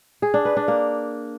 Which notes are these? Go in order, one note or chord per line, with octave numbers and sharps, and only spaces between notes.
G#4
D4
B4
D4
A#3